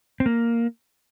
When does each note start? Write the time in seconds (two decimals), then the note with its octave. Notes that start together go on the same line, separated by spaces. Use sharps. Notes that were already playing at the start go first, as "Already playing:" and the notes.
0.20 C4
0.26 A#3